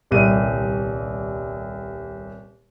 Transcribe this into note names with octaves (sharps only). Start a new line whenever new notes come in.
D#1 C2 D#7